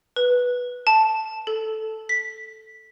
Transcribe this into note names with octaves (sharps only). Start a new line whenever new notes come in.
B4
A5
A4
B6